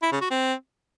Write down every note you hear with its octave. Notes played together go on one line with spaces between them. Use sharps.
E4
C#3
F#4
C4